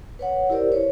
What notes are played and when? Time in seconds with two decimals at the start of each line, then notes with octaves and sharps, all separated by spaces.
0.19 B4 C#5 F#5
0.50 E4 G4 A#4 C5 D5
0.72 B4 C#5